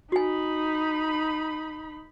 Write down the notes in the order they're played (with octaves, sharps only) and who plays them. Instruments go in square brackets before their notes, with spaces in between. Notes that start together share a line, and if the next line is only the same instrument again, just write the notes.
[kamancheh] D#4 B5 [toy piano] F#4 G#5